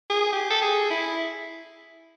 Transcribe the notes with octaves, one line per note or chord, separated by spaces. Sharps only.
G#4
G4
A4
G#4
E4